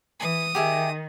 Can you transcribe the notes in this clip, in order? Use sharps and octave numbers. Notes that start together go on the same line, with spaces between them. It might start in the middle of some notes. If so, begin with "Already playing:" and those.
E3 D#6
D#3 G4 G#4 E5